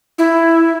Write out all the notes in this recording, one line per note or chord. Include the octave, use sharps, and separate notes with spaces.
E4